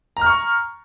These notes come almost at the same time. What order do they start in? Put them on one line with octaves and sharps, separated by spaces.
A#5 F6 C#6